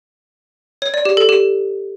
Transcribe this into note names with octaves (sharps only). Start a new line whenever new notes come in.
C#5
D5
G4
A4
G4